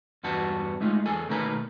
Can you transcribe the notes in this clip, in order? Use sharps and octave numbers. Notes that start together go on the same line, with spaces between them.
E2 G2 B3 F#4 A5
G#3 A3 D#4 F4
E2 G#4 A4 G#5
B2 D#3 A3 A#3 B4 A#5